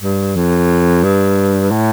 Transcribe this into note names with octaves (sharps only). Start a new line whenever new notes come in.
G2
F2
G2
A2